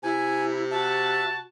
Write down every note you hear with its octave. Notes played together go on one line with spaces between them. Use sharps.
C3 E4 G#5
F#4 E5 A5